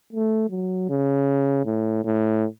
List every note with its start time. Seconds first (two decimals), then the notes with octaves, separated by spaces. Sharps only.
0.13 A3
0.50 F#3
0.89 C#3
1.65 A2
2.05 A2